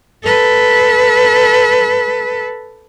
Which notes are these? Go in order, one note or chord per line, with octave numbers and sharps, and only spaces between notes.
A4 B4